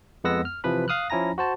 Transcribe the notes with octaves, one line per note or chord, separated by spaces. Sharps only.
F2 G#3 B3 F#5 E6 A#6
F6
C3 E3 F3 B4 B5
F5 D#6 F6 F#6
F3 C#4 E4 G#5 A#5 A#6
F#4 C5 A5